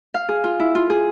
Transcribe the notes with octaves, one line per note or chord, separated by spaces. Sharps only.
F5
G#4
F4
E4
F4
G#4